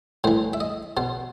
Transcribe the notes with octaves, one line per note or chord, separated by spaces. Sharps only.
A2 E3 C5
E5
D#5
B2 C5